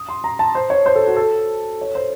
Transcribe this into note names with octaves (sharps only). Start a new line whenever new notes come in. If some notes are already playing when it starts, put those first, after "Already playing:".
Already playing: D#6
C6
A#5
A5
C5
C#5
C5
A4
F#4
A4
C#5
C5